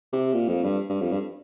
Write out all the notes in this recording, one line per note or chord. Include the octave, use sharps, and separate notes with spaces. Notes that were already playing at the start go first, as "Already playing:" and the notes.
C3
A#2
F2
G2
G2
F2
G2